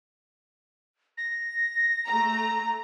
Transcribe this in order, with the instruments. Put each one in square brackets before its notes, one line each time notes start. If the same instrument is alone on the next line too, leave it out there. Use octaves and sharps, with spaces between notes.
[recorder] A#6
[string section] A3 A#5